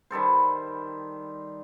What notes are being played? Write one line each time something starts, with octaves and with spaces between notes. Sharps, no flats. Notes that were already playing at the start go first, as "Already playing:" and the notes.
D#3 G3 A4 C5